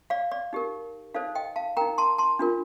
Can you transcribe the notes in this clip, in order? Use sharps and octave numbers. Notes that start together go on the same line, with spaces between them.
D5 F5
D5
D#4 G4 A#4
D#4 A4 C5 D5 F5
D#5 G5
F5 A5
D#4 A#4 G5 A#5
A5 C6
A5 C6
D4 F4 A#4